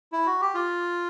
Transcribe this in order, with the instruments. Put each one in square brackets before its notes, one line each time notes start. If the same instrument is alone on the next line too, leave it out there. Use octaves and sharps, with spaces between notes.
[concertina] E4
F#4
G4
F4